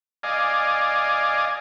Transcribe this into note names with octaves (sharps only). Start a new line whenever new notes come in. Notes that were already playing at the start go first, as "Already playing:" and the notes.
D5 D#5 F5 G#5